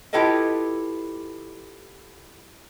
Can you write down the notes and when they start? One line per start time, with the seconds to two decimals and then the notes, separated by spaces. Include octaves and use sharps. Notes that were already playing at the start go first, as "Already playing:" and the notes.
0.13 E4 F4 G4 A4 B4 D#5